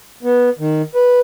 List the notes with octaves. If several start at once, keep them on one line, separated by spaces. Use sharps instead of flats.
B3
D#3
B4